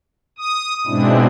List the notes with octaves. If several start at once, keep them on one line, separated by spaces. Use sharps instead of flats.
D#6
G#2 B2 G#3 C4 D4 E4